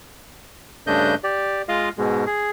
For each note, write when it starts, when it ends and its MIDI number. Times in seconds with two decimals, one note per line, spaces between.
0.87 1.15 43
0.87 1.15 49
0.87 1.15 57
0.87 1.15 62
0.87 1.15 75
0.87 1.15 91
1.24 1.62 67
1.24 1.62 74
1.69 1.89 56
1.69 1.89 65
1.69 1.89 75
1.69 1.89 77
1.98 2.25 44
1.98 2.25 47
1.98 2.25 56
2.27 2.51 68